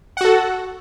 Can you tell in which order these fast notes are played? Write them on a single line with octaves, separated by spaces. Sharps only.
F#5 F#4 A4